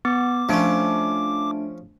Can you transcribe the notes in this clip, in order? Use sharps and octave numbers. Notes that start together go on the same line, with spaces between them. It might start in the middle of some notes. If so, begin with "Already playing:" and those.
B3 D6
F3 A3 C#4 D4 D7